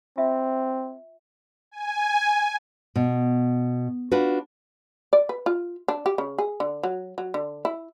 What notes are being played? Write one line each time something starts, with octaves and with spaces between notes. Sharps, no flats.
C4 F4 E5
G#5
B2
D4 F4 F#4 B4
D5
B4
F4
D4
G4
C#3
G#4
D3
F#3
F#3
D3
E4